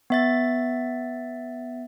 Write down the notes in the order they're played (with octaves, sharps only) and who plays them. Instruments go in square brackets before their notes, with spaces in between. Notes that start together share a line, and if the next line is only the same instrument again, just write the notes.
[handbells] B3 E5 A6